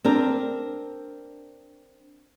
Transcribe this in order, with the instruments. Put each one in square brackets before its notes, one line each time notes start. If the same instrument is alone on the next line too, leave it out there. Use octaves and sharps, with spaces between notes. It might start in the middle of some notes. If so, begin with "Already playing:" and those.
[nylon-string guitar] C4 D4 A#4